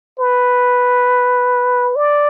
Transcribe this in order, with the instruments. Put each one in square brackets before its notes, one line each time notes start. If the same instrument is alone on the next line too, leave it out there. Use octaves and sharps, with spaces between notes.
[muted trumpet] B4
D5